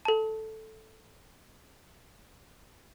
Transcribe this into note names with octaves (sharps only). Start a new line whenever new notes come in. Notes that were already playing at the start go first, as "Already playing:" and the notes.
A4 A5